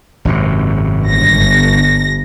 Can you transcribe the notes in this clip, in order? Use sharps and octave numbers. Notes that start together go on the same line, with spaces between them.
G#1 F#2 C3
G1 A#6